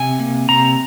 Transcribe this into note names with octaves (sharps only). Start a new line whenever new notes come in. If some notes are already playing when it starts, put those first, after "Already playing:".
Already playing: C3 G#5
A#3
C3 A#5